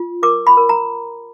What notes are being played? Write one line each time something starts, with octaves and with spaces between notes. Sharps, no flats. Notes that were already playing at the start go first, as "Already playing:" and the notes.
Already playing: F4
A#4 D6
B5
A#4
A#5